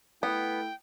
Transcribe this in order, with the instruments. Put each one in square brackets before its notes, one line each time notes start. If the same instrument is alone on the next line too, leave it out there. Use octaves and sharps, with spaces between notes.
[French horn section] A3 E4 [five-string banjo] B3 [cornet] G5